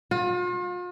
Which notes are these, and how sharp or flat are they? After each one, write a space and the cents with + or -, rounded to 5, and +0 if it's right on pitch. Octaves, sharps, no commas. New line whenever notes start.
F4 +40